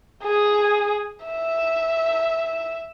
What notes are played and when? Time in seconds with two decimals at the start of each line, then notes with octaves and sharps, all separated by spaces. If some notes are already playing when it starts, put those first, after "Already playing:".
0.23 G#4
1.25 E5